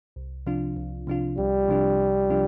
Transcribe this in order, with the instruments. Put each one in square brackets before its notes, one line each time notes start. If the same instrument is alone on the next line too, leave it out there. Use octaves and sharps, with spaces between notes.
[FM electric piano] C2
C3 F3 D4 F4
C2
C3 F3 D4 F4
[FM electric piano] C2 [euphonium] G3
[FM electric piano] C3 F3 D4 F4
C2
C3 F3 D4 F4